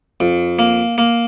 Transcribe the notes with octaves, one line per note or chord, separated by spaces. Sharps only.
F2
A#3
A#3